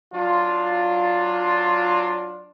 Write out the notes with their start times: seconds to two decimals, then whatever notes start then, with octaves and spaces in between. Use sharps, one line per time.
0.13 F#3 D4 F4